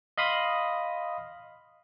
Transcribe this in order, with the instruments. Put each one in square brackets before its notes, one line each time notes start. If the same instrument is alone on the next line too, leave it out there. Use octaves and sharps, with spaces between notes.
[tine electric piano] D#5 F5 B5 C6 D#6